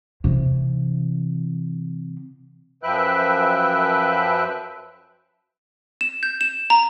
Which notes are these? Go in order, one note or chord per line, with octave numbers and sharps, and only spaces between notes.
C3 E3
F#2 F3 B4 E5 G5 F#6
E7
G6
E7
A#5